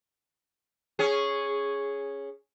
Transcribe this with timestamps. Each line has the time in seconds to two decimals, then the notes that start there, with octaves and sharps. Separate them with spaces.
0.99 C#4 G#4